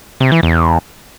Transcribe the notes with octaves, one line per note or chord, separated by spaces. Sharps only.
C3
E3
E2